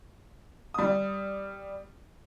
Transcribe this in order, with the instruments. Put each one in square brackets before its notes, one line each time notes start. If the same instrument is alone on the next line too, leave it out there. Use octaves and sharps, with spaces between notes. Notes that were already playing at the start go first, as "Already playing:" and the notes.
[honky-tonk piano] G3 D#6